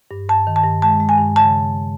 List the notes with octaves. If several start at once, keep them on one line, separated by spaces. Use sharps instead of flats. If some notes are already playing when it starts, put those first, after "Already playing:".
G2
G2 A5
D#3
A5
G2
G#3 A5
G#3
G#5
G2
C#3 A5